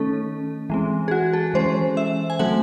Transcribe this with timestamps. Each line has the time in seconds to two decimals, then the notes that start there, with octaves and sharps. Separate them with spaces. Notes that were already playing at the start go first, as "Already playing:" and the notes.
Already playing: D#3 A3 C#4 A4
0.70 E3 G#3 C4
1.08 G#4
1.11 F#4
1.33 A4
1.54 E3 G#3 C#4 C5
1.97 E5
2.30 G#5
2.39 F#3 A3 C4 F#5